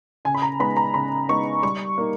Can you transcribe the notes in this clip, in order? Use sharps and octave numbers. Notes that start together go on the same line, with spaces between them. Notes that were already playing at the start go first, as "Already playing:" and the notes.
C#3 G#5
B5
A#5
G#3 B3 D#4 B5
A#5
C#3 B5
G#3 B3 D#4 C#6
G3 C#6
A#3 D#4